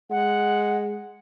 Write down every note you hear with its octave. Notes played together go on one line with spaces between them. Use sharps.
G#3 F#5